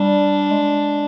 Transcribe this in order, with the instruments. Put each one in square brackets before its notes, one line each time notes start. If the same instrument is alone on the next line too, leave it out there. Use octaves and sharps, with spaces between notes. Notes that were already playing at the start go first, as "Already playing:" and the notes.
Already playing: [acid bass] G3 [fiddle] D4
[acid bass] G#3